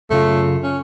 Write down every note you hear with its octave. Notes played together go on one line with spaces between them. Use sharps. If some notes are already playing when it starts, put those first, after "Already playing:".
F#2 C#3 A3 F4
C#4